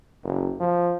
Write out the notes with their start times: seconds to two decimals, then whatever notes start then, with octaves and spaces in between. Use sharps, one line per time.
0.23 F#1
0.60 F3